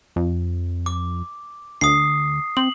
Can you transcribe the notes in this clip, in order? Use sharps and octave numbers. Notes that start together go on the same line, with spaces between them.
F2
D6
D2 D#6 C7
C4 F#7